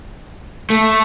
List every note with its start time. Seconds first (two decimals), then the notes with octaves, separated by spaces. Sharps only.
0.70 A3